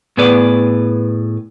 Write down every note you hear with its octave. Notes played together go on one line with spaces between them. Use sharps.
A2 B3 G#4 B4 D5